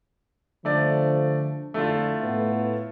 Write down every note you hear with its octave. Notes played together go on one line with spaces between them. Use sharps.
D3 F3 A3 D5
F2 D3 A3 E4 F4
A2 B3